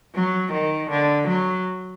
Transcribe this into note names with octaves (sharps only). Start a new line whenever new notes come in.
F#3
D#3
D3
F#3